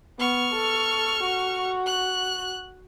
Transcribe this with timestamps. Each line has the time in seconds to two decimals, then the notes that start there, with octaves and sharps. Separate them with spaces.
0.19 B3 C#6 F6
0.54 A4
1.24 F#4
1.86 F#6